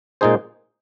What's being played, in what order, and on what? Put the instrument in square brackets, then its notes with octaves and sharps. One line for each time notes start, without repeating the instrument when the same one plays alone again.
[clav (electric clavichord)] A#2 G#3 D#4 G#4 C5